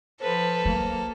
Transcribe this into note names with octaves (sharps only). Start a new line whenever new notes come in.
F3 A4 B4 C5
F#3 A#3